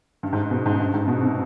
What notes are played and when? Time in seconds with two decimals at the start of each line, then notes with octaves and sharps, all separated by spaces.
0.23 G2
0.33 G#2
0.51 B2
0.66 G#2
0.80 G2
0.94 G#2
1.08 B2
1.22 C3